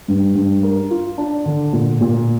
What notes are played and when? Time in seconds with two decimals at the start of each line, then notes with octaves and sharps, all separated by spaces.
0.08 G2
0.35 G2
0.63 A#4
0.91 F4
1.18 D4
1.46 D3
1.73 A#2
2.01 A#2